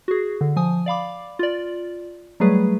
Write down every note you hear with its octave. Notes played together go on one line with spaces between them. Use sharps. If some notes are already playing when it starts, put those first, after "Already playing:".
F#4 G#4
D3
F3 G#5 D#6
D5 F5 B5 D6
F4 D5
F#3 G3 A3 G#4 B4